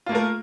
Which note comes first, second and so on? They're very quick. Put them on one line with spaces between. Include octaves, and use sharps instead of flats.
F4 A#3 A3 A#4